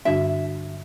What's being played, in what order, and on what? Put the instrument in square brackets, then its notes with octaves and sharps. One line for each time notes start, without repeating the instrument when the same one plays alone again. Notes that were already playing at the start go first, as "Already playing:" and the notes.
[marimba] G2 D3 G3 D4 F#4 [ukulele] E5